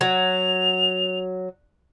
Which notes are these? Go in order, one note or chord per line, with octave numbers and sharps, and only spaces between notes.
F#3 F7